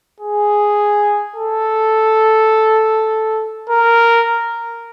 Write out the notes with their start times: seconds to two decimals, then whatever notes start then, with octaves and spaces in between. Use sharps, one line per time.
0.20 G#4
1.36 A4
3.70 A#4